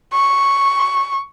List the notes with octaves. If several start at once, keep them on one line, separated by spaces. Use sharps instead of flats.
C#6